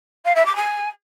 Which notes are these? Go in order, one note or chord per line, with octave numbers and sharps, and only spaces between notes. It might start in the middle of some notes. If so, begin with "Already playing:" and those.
F5
E5
D6
G#5